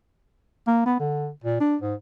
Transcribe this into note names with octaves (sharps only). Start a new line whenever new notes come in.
A#3
B3
D3
A#2
D4
G#2